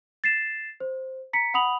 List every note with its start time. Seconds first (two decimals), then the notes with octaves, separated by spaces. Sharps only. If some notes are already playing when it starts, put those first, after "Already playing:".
0.24 A6 C7 E7
0.80 C5
1.33 A#5 B6 C#7
1.54 F#5 B5 D#6 F7 F#7